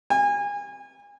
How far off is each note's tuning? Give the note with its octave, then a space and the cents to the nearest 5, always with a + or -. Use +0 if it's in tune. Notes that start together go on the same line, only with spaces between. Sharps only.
G#5 -30